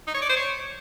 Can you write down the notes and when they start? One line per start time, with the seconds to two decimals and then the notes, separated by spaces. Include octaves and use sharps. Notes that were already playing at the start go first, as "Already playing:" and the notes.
0.07 D#4
0.15 C#5
0.22 D5
0.29 C5
0.37 C#5